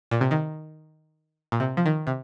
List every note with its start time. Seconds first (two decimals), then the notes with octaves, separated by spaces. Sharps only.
0.11 A#2
0.21 C3
0.31 D#3
1.52 A#2
1.60 C3
1.77 F3
1.86 D#3
2.07 C3